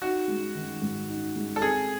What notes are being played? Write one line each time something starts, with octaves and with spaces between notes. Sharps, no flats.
D#4 F#4
G#3
D#3
G#2
D#4
G#3
A4
C4 G#4